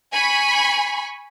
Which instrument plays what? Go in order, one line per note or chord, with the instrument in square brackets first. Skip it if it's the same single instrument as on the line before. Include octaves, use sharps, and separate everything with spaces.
[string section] G#5 B5 C#6